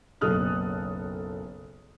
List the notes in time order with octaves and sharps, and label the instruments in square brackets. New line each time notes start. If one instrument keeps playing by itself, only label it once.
[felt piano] F#1 B1 A4 D#6 F6 F#6